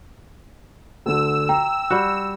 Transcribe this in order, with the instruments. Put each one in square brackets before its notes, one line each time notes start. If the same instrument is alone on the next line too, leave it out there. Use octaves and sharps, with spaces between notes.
[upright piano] D2 D3 [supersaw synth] E6
[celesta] G5 [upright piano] A#5
[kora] G3 F#4